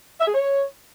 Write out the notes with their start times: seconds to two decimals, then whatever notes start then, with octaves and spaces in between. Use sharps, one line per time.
0.20 E5
0.27 G#4
0.34 C#5